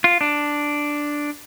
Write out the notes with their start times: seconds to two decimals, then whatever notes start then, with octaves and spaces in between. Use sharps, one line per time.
0.04 F4
0.21 D4